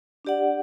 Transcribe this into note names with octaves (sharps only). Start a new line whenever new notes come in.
D4 G4 D5 F#5